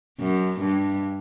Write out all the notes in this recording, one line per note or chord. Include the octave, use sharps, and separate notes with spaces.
F#2
G2